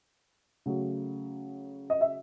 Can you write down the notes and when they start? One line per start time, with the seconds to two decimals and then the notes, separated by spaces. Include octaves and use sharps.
0.66 C#3 F#3 A3
1.90 D#5
2.01 E5